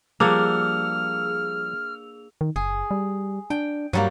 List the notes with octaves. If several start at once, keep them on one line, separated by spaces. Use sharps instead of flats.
F3 G3 A#3 D4 G#4 E6 F6 F7
D#3
F#1 G#4
G3
D4 G5
G2 F#3 G3 A#3